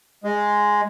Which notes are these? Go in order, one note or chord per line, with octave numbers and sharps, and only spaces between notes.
G#3